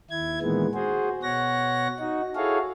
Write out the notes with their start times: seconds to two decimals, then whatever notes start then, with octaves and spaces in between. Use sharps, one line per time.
0.10 D#2 E4 G#6
0.41 A#2 D#3 E3 G#3 B3
0.74 F#4 G#4 C5
1.23 B2 C#5 F#5 A#6
1.99 D#4 F#4
2.36 E4 F#4 G#4 A4 C#5 F5